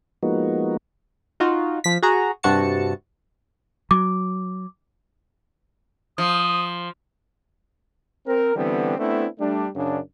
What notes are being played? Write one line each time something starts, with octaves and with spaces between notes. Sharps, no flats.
F3 G#3 A#3 B3 D#4 F#4
D#4 F4 F#4
F3 B6
F#4 G#4 A#5
G2 C3 F#4 A5 C#7
F#3 D6
F3 D#6
C4 A#4
D3 E3 G3 B3 C4
A3 B3 C4 D4 E4
G3 A3 D4
F#2 C#3 D4